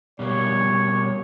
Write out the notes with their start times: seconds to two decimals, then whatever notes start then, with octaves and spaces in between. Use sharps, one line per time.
0.19 B2 G3 A#3 C#5